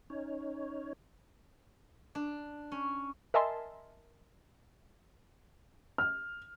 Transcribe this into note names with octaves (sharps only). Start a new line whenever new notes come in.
C#4 D#4 C#5
D4
C#4
A#4 D#5 E5 G#5 A5 C6
F6